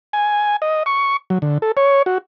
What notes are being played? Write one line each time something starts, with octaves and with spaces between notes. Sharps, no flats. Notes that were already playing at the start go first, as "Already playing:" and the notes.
G#5
D#5
C#6
F#3
D3
A4
C#5
F#4